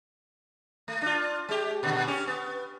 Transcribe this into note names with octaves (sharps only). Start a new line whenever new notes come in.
A3
D4 F4
G#3 G4
A#2 D3
C#4 G4
B3